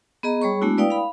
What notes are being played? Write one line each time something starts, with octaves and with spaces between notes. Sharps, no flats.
B3 G#4 D#5 A#5
G3 G#4 C#5 B5 C#6
G#3 A3 B3 D4 E4 F#4
E4 B4 D5 F5 G5 D#6
F5 B5